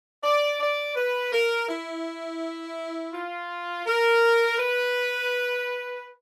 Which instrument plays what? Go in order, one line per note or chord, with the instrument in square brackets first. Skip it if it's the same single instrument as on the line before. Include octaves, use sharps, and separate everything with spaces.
[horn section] D5
D5
B4
A#4
E4
F4
A#4
B4